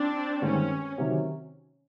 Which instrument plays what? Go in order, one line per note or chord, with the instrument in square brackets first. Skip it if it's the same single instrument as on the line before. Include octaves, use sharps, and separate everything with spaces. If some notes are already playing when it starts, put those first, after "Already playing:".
Already playing: [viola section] C4 D4
[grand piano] G2 D#3 G#3 C4 [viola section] C#4
[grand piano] C3 D#3 F#3